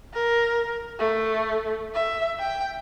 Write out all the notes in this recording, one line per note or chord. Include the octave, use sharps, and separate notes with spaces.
A#4
A3
E5
G5